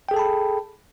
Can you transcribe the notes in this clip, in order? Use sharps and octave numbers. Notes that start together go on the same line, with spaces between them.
G#4 A4 G5 A5 B5